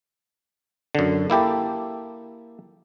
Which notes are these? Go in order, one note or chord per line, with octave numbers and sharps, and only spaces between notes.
F#2 D3
A#3 E4 G4 A4